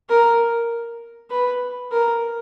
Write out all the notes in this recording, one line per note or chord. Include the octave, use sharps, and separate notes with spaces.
A#4
B4
A#4